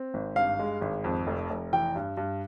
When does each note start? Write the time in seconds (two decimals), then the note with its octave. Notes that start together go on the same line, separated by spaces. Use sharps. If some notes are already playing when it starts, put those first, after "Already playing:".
Already playing: C4
0.14 G#1
0.36 G2 F5
0.59 G#3
0.81 G#1
1.04 F2
1.27 F1
1.50 F1
1.73 E3 G5
1.96 G2
2.17 G2